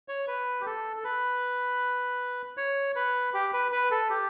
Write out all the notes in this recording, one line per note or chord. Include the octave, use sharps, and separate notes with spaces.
C#5
B4
G4
A4
A4
B4
C#5
B4
G4
B4
B4
A4
G4